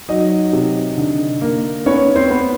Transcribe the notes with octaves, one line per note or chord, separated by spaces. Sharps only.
F#3 D#4 D#5
C3
D3
A#3
B3 C#4 C#5
C4 C5
B3